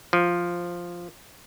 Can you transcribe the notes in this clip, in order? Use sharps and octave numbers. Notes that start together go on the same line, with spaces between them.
F3